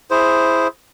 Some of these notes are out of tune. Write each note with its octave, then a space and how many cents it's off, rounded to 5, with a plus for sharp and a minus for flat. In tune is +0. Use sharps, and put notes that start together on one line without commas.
E4 +0 G#4 +0 C5 +0